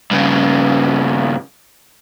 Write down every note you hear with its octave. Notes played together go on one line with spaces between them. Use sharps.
G2 C#3